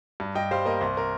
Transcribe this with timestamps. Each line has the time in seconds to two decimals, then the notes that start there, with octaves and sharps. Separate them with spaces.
0.20 G2
0.35 G2 D#5 G5
0.51 G3 C5 F5
0.65 A#3 A#4 D#5
0.81 C2 C5
0.97 A#4